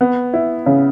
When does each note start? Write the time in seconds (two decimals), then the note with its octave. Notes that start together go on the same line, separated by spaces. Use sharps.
0.01 B3
0.33 E4
0.66 C#3